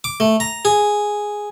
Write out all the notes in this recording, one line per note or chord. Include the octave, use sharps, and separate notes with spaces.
D6
A3
A#5
G#4